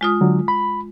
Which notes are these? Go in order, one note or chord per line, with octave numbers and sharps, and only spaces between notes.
G#3 F4 D#6
D3 F#3
B5